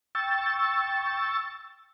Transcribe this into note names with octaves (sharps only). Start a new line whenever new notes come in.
G5 C#6 E6 A6